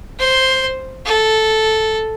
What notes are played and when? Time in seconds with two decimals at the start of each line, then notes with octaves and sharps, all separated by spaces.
0.19 C5
1.05 A4